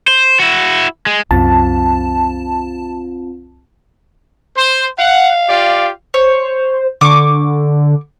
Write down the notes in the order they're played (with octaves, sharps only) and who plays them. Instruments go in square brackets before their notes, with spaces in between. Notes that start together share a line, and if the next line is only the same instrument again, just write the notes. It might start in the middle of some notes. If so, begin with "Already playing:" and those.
[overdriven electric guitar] C5
E4 F#4
G#3
[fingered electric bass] C2 F#2 [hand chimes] C4 F4 [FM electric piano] A5
[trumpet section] C5
[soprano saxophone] F5 [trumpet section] F#5
[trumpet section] F4 G4 D5
[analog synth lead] C5 [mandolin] C#5
[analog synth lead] D3 [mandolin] C#6 D6